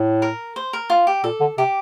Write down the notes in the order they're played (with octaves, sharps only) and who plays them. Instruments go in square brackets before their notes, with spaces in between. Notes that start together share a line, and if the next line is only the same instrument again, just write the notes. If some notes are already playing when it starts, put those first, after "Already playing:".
Already playing: [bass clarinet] A2
[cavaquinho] A#4
C5
A#4
F4
G4
[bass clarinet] A#2 [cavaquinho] A4
[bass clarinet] D3
[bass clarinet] C3 [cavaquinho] G4